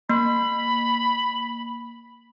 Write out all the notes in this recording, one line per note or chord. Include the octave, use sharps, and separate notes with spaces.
A#3 B5